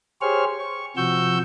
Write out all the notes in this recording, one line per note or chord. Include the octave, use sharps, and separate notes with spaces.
G4 G#4 C5 C#5 C#6 F6
C#6
C3 F3 F#4 C#6 E6 G6